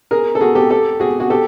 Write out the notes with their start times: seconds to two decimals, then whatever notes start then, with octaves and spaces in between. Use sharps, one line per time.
0.11 G#4 A#4
0.35 A4
0.41 F#4 G#4
0.55 G4 A4
0.70 G4 A4
1.00 F#4 G#4
1.20 F#4 G#4
1.30 G4 A4